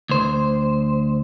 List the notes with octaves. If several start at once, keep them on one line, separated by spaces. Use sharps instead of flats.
D2 C5